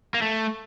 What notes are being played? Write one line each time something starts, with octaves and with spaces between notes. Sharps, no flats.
A#3
A3